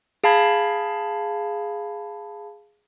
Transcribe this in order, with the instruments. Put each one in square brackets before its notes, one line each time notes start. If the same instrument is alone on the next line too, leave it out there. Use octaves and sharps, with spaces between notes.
[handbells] G#4 F5 A5 B5 G#6